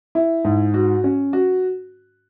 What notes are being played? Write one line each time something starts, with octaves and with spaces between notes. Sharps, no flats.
E4
G#2
F#4
C#4
F#4